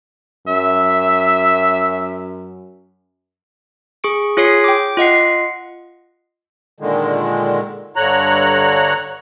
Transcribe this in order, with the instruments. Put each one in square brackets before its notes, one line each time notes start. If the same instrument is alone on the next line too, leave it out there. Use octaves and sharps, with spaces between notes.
[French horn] F#2 [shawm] E5
[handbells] G#4 C#6 D7
F4 G#4 C#5 D#6 C7
G5 D6
F4 D#5 F#5 C7
[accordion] A#2 D3 D#3 G#3
G2 D3 C#5 A#5 F#6